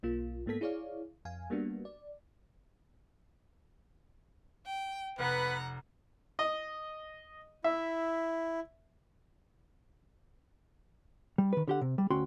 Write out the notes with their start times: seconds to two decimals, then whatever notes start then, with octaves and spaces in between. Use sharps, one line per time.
0.03 B1 A#3 F4
0.46 G#2 A#3 B3 A4 B6
0.61 E4 G#4 C#5 D5 F5
1.25 F2 F5 G#5
1.50 G3 A#3 B3 D4 F#4
1.85 D5
4.66 G5
5.19 F1 B3 B4 F#5 A#5
6.39 D#5
7.64 E4 E5
11.38 G3
11.53 D#3 B4
11.68 D3 G4 F#5
11.81 C3
11.98 G3
12.10 D2 C#4 F#4 G5 C6